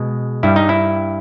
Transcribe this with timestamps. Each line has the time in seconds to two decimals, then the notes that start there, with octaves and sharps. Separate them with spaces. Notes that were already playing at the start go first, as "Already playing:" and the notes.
Already playing: B2 G#3
0.43 G2 G3 E4
0.56 D#4
0.69 E4